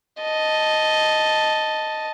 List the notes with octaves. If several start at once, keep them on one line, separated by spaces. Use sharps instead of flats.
D#5 A5